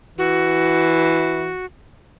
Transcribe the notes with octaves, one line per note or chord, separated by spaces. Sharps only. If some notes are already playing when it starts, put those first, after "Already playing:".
E3 F#4